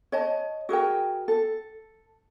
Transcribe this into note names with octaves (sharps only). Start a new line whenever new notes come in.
C#5 D#5 A5
F#4 G#4 A#4 G5
A4